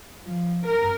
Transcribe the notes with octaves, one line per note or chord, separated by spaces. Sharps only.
F3
A#4